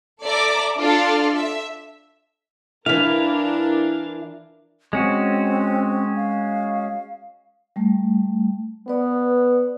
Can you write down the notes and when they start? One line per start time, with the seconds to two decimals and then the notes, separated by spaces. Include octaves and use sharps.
0.24 A4 D5 E5 A#5 D6
0.80 D4 F4 A4 D5 F5
1.35 E5
2.86 E3 D4 E4 A#4 F5
4.93 G#3 C4 C#4 F#4
6.16 F5
7.76 G3 A3
8.88 B3 B4 D5